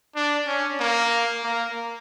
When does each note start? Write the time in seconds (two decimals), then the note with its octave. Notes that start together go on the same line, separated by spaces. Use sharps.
0.15 D4
0.47 C#4
0.80 A#3
1.44 A#3